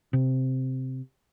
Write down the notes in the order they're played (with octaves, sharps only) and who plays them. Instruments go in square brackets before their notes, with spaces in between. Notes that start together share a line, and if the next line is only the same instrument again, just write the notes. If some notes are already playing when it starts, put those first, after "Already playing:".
[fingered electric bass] C3